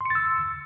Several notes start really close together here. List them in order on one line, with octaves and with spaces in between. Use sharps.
C6 C#7 A6 E6